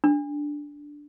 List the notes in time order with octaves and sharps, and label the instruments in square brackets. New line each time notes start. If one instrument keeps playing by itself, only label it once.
[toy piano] D4